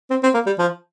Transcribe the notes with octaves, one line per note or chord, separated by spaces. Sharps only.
C4
C4
A#3
G3
F3